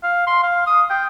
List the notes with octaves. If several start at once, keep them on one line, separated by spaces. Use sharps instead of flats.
F5
C6
F5
D#6
G5